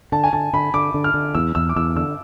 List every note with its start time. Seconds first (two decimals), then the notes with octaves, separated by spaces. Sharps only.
0.12 D3 A5
0.24 G#5
0.33 D3 A5
0.53 D3 B5
0.74 D3 D6
0.94 D3
1.04 F6
1.14 D3
1.35 E2 E6
1.55 E2 E6
1.69 D6
1.76 E2 E6
1.96 D3 E6